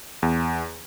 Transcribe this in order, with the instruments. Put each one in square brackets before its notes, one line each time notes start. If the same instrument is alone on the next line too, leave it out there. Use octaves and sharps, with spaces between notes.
[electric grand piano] E2